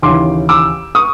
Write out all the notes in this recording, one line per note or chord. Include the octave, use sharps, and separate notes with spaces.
D#2 C#3 E3 C6 D6
D6 E6
C#6 D#6